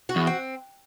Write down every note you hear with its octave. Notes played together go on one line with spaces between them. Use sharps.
F#4
E2
C4